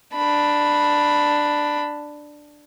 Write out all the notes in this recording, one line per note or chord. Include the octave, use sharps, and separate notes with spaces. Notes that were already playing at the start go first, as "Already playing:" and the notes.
D4 B5